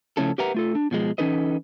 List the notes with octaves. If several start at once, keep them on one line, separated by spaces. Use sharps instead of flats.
C#3 F3 A3 C#4 E4 A4
G4 A#4 B4 E5 F#5 A#5
A3 F4 A4
D4
B2 F3 G#3
E3 C#4 D#4 A4 B4 D#5